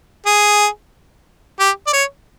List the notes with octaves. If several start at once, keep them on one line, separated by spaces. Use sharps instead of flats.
G#4
G4
D5
C#5